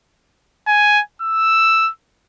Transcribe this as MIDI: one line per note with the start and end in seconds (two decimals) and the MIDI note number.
0.68 1.01 80
1.22 1.90 88